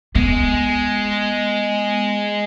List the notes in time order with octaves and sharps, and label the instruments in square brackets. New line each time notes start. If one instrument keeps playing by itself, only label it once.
[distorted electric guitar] G#3 [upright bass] B3